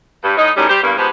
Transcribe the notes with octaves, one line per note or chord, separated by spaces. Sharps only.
G2
A2 D#4
F#2 A2 D#3 G3 C#4
G3 G4 C5
E2 G2 A#3
G#2 F3 B3 G4 G#4 C5